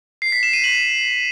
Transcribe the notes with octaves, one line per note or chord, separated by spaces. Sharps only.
C7
B6
E7
D#7
F#7